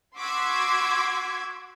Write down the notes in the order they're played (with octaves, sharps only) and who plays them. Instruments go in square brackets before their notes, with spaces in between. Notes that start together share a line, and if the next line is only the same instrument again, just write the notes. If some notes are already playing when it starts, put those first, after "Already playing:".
[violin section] F#4 C6 D6 E6 G#6 B6